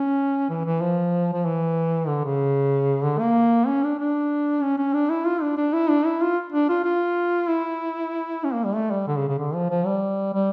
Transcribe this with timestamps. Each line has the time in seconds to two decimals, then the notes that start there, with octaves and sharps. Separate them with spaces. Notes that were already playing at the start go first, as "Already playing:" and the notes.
Already playing: C#4
0.49 E3
0.65 E3
0.81 F3
1.33 F3
1.45 E3
2.08 D3
2.24 C#3
3.03 D3
3.19 A#3
3.67 C#4
3.83 D4
3.99 D4
4.62 C#4
4.78 C#4
4.93 D4
5.10 E4
5.26 F4
5.42 D4
5.57 D4
5.73 E4
5.89 D4
6.05 E4
6.22 F4
6.52 D4
6.69 F4
6.84 F4
7.48 E4
8.44 C#4
8.53 A#3
8.64 G3
8.75 A3
8.91 G3
9.07 D3
9.17 C#3
9.28 C#3
9.39 D3
9.54 F3
9.70 F3
9.86 G3
10.34 G3